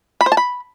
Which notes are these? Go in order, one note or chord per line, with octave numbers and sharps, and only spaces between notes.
B5
C5
A5
B5